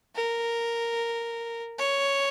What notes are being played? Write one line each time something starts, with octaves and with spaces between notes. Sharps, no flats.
A#4
C#5